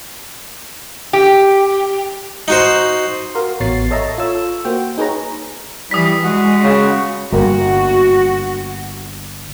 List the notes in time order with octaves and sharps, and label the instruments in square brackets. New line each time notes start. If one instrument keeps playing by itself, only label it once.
[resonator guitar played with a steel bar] G4
[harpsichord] D#4 F#4 C5
[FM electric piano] F#4 A#4 F5 C6
A1 B3 F#4 C#5 A6 C7
A4 C#5 D#5 E5 A5 A#5
F4 A4 C#5 E6
A#3 F#4 C5 G5
D#4 G#4 B4 C#5 A#5
[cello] E3 [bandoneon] G3 [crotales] D#6 B6
[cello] G#3 [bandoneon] F#4 F#5
[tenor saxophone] C#3
[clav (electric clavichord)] G1 A#3 [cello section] F#4